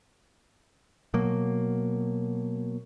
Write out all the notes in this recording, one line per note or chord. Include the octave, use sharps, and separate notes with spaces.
B2 F#3 A#3